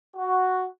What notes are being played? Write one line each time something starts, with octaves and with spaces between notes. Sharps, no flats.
F#4